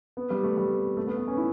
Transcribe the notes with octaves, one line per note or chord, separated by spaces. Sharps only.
B3
G3
A3
G3
A3
B3
B3
C#4
E4